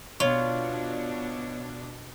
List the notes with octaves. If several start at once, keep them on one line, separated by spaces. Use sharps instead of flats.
B2 D4 F4 C#5